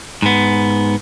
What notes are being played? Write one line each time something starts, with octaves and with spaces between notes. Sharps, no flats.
G#2 B3